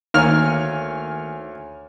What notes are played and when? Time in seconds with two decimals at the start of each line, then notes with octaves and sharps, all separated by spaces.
0.14 D2 D#3 A#3 C#5 G#5 F6